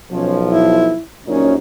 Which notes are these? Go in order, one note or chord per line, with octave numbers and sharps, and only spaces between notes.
B1 F3 C#4
E4
A#1 F#2 C#4 D#4